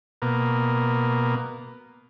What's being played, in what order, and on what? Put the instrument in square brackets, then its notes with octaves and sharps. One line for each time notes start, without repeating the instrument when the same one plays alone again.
[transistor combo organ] B2 A#3